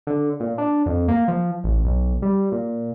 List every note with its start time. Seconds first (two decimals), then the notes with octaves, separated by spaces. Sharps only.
0.07 D3
0.40 A#2
0.58 D4
0.86 F2
1.08 A#3
1.28 F3
1.64 A1
1.85 B1
2.22 G3
2.52 A#2